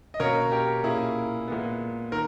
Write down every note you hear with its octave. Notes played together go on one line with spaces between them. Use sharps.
D#5
B2 A#3 C#4 A#4 C#5
G4 A#4
A#2 A#3 C#4 E4 G#4
A#2 G#3 B3
D#3 A#4